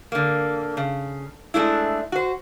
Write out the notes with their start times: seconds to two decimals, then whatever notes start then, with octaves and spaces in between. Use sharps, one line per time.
0.12 D3 A#3
0.77 C#3
1.54 G#3 A3 D4 E4
2.12 F#4 C5